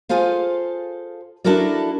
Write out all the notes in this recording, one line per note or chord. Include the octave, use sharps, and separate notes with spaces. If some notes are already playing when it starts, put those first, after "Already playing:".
F4 G#4 A4 C5 F5
D4 E4 F#4 A4 A#4 D5